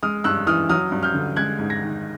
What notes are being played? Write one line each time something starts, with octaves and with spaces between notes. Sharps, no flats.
G#3 D#6 F6
G2 E6 F#6
E3 D#6 F6
F#3 D#6 F6
G2
F6 G6
D3
G#3 F#6 G#6
G#2
G#6 A#6
D#3